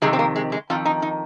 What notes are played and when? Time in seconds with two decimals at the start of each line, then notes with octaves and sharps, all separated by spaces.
0.02 F2 C3 D#3 G#3
0.13 C4
0.19 A#3
0.36 G#3
0.52 G#3
0.70 F2 D#3 F4
0.85 D#4
1.02 D#4